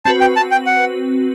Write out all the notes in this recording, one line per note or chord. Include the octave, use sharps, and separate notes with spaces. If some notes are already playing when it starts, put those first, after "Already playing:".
C4 F#4 B4 A5
G5
A5
G5
F#5